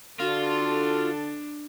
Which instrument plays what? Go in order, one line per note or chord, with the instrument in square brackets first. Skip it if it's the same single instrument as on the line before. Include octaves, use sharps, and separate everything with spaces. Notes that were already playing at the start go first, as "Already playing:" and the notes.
[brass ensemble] D3 A4 [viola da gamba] D4 [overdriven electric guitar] F4 [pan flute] F#4